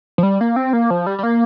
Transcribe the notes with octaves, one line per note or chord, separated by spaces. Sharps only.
F3
G3
A#3
C4
A#3
F3
G3
G3
A#3